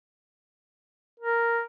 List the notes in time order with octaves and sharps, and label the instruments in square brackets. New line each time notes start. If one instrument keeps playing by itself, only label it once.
[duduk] A#4